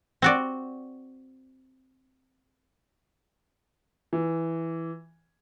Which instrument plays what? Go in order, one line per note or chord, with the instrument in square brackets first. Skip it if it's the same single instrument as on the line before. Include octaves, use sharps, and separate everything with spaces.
[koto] C4 F#4 D5
[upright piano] E3